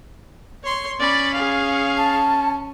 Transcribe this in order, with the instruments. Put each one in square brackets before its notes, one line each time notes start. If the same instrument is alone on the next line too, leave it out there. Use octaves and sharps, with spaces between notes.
[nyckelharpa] C#5 C6
[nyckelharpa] C#4 [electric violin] D5 B5
[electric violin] G#4 F5
[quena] A5